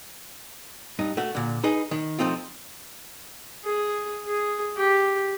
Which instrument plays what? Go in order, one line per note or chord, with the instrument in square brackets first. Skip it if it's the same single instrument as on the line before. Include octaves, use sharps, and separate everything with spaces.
[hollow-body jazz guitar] G2 D#4
A3 F#4
A#2 D3
D#4 G#4 B4
D#3
F3 A3 C4 D#4 F4
[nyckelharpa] G#4
G#4
G4